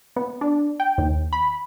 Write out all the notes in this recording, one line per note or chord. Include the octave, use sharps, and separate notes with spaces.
B3
D4
G5
D#2
B5